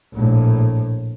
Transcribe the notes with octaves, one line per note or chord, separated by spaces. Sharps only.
A#1 A2